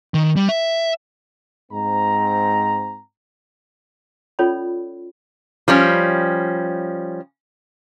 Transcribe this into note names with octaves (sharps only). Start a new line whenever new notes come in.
D#3
G3
E5
G#2 C4 A#5
C#4 F4 A4 C#5 D5 B5
F3 G3 C#4